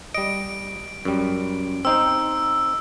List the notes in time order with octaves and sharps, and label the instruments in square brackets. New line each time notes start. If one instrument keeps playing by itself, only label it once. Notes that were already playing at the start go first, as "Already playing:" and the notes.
[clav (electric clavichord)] G3 D#5 [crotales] D7
[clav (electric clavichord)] F#2 G3
[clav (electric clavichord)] C4 D#4 C5 [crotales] E6